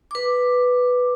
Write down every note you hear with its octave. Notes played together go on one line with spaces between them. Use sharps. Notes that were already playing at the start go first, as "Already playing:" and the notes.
B4 D6